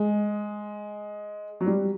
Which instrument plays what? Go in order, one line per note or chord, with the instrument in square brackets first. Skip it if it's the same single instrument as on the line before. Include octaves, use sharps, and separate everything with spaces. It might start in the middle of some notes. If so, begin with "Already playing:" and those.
Already playing: [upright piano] G#3
F#3
G3